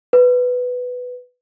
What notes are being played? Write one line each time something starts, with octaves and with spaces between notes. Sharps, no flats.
B4